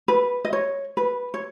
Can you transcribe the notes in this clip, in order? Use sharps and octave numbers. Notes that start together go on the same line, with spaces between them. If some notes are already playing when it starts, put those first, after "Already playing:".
B4
D#5
C#5
B4
C#5